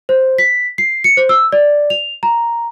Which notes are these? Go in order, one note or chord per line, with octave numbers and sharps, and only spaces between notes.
C5
B6
C7
C#7
C5
E6
D5
F7
A#5